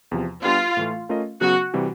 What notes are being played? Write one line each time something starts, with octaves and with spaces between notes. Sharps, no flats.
E2 C3 F3
G3 B3 D4 F4 G4 B4
A2 E3 A3
A3 C#4 F4 A#4 D#5
C#3 F#3 B3 F#4
C3 E3 G3